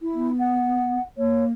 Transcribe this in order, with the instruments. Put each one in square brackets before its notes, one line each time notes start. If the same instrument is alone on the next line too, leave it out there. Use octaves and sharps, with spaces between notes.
[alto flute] E4
[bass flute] B3
[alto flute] F#5
[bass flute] A#3 [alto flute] C#5